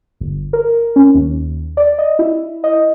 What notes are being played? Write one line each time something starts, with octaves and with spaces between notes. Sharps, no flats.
G1
A#4
C#4
D#2
D5
D#5
E4
D#5